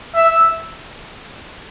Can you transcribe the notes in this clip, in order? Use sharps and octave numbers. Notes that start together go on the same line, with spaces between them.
E5